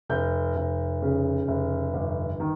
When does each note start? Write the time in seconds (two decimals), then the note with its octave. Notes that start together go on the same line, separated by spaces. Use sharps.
0.09 F1 G6
0.56 F1
1.02 C#3
1.48 F1
1.94 G1
2.40 D#3